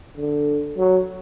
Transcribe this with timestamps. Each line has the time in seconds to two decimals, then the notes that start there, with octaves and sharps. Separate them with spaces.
0.17 D3
0.78 F#3